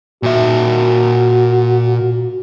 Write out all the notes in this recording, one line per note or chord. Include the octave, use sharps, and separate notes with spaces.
A#2 F#4 E5